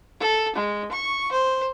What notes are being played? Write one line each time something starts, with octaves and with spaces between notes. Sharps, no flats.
A4
G#3
C#6
C5